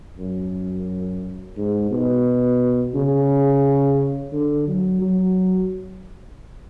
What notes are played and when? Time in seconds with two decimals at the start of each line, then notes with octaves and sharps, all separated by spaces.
0.19 F#2
1.57 G#2
1.91 B2
2.95 C#3
4.32 D3
4.68 F#3
5.01 F#3